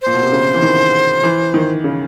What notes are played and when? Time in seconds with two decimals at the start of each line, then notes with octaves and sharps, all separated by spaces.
0.02 A#2 C5
0.14 B2
0.23 C3
0.32 C#3
0.54 E3
0.62 D#3
1.23 E3
1.54 D#3
1.84 C#3